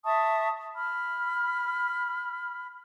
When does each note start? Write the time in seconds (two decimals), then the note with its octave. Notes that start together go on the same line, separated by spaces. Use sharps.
0.04 E5 A5 C#6 D#6
0.73 B5 F6